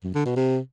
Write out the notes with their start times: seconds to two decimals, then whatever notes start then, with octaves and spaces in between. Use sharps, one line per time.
0.04 F#2
0.14 D3
0.25 B2
0.36 C3